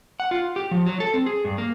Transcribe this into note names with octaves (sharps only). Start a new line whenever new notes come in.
F#5
F4
G4
F3
F#3
A4
C4
G#4
G2
A#3